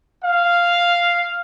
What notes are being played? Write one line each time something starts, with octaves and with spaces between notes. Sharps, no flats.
F5